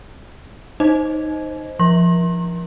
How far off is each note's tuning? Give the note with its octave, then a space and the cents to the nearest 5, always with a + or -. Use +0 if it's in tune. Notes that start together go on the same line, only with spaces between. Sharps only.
D#4 +0 C5 +0 D#5 +0
F3 -15 C6 +40